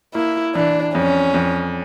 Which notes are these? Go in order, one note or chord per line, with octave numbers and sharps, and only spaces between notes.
A#3 E4
E3 D4
F2 C#4
F2